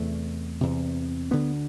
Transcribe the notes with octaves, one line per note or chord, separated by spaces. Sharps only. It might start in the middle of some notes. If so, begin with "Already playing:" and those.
Already playing: E2 C3 A3
E2 C3
D2 D3 B3